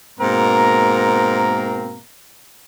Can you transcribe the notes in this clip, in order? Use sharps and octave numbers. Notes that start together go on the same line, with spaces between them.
G#2 B2 A#3 C4 A#4 A#5